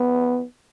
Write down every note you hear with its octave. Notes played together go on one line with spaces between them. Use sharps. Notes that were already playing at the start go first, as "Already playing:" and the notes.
Already playing: B3